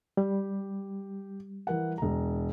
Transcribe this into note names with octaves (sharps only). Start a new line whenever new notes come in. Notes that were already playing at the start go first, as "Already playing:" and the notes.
G3 G4
E3 A#4 F#5
E1 A#5